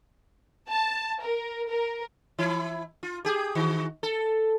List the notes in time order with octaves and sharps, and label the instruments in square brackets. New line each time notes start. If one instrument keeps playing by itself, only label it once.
[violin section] A5
A#4
A#4
[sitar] E3 E4
F4
G4 G#4
D#3 F#4
A4